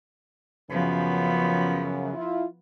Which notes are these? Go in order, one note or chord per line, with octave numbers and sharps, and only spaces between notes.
F#2 C#3 F3 B3
E4 F4